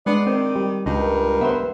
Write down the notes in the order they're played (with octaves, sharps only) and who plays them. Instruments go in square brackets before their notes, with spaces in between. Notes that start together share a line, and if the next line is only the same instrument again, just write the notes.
[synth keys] G#3 D4 C7 [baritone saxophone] B3 [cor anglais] D5
[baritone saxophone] D#3 [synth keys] C4
[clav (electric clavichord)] G3
[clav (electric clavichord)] C#2 [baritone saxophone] G2 [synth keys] D#4
[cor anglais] A#4
[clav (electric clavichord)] B3 B4 [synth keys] C5 E5